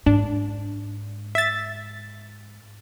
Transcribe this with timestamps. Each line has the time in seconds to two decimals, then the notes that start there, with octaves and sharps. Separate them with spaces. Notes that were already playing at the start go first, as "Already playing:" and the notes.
0.06 G#2 D4
1.35 E5 A6